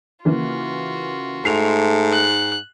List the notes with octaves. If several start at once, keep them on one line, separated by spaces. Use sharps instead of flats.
C#3 E3 A#3 F4 F#4
G#2 A3 C7 F7
F#6